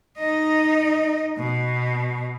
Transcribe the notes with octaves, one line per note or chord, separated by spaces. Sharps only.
D#4 D#5
B2